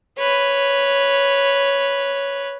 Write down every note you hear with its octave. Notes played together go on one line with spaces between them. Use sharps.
B4 C#5